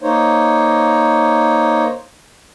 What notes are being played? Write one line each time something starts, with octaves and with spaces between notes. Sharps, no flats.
A#3 D#4 C5 C#5